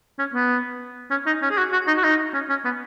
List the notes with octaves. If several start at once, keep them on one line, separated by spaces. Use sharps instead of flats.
C#4
B3
C#4
D#4
C#4
G#4
F#4
F#4
D#4
F#4
D#4
C#4
C#4
B3